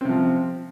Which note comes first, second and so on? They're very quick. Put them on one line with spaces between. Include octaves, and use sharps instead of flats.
C4 C3 F3